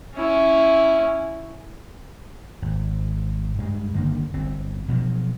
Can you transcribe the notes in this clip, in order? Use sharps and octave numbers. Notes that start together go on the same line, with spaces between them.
C#4 E4
G#1
G2 G3 G#3
G1 D3 D#3 A#3
G1 C4
B2 F3 F#3